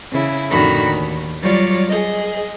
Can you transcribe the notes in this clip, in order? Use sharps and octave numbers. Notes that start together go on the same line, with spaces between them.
C#3 E4
F2 A2 D3 D#3 F#4 B5
D#2
F#3 G3 F4 C#5 D5
G#4 D#5